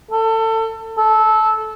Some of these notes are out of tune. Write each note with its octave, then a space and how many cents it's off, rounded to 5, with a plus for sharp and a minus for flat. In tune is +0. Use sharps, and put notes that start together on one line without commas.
A4 +25
A4 -15